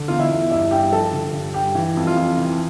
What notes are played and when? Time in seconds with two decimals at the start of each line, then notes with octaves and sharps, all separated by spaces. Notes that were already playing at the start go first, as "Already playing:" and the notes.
Already playing: D3
0.08 E2 F4
0.19 E4
0.31 E2
0.51 G2 E4
0.71 G2 G4
0.92 F3 A4
1.13 D3
1.34 G2
1.54 G2 G4
1.75 E3
1.97 F2
2.07 F4
2.17 F2
2.37 E3